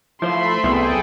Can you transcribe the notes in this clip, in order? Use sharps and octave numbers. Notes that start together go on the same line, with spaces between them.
F3 A3 E4 C5 E5 B5 C6
C2 F#2 B3 E4 G#4 A4 G5